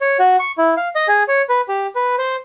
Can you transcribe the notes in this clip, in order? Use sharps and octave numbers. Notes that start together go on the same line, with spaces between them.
C#5
F#4
C#6
E4
F5
D#5
G#4
C#5
B4
G4
B4
C5